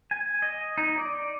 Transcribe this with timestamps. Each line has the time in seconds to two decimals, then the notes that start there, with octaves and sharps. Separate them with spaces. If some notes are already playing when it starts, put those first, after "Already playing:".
0.11 G#5
0.42 D#5
0.78 D#4
0.98 D5